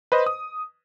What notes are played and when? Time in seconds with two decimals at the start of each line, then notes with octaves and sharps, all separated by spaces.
0.12 B4 C5 D#5
0.26 D#6